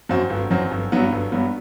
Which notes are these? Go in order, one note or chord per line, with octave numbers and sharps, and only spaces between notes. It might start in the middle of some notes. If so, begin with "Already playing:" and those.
F#2 F#3 C4 F#4
G1
F#2 F#3 C4 F#4
G1
G2 F#3 B3
G1
G2 F#3 B3